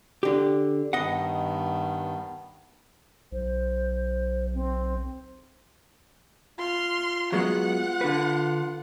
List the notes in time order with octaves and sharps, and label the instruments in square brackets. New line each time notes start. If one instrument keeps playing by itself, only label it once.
[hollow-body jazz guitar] D3 G4
[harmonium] G2 D#3 B3 [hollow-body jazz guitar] D#5 F#5
[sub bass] B1 [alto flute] C5
[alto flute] C4
[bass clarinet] F4 [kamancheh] C6 F6
[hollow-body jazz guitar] F#3 G#3 B3 [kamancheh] F#5
[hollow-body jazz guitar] D3 B4